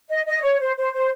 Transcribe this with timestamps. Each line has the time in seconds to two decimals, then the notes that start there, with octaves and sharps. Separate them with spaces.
0.09 D#5
0.26 D#5
0.43 C#5
0.60 C5
0.76 C5
0.93 C5